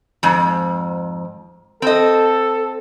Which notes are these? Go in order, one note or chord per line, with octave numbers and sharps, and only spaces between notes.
F2 G#2
C4 A4 D#5